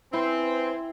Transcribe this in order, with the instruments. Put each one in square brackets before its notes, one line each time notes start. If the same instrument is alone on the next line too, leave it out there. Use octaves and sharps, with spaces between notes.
[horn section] C4 [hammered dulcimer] E4 [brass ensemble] B4 G5 G#5